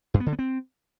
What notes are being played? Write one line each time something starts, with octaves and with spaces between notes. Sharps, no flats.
G2
B3
D3
B3
C4